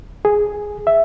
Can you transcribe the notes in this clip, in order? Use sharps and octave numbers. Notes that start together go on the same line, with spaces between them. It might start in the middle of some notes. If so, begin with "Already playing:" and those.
G#4
E5